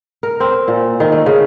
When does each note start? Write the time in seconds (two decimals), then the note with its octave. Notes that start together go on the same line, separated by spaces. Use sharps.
0.23 A#4
0.40 C4
0.68 A#2
1.00 D#3
1.12 A3
1.26 C#3